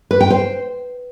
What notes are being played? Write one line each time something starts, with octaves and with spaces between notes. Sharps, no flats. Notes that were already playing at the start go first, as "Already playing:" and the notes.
B4
G5
C5